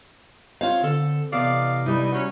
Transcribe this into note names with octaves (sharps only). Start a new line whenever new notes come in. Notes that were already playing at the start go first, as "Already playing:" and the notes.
C4 F4 C#5 F5
D3 A4
E2 C3 D5 D#5 F5
E3 G3 D#4 E4
F#3 C#4